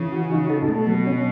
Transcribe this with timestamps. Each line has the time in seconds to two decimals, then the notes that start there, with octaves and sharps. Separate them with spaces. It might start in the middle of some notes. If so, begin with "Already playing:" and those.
Already playing: C#3 E3
0.12 F#4
0.32 D#4
0.50 A4
0.69 B2 A3
0.87 F#3
1.07 C#4